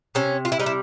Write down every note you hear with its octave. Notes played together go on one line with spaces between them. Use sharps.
C3 C#4
F4
E4
G3 D#4
E4